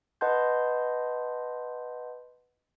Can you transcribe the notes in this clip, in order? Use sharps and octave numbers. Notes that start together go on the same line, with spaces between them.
B4 D#5 F#5 A5 C6 G6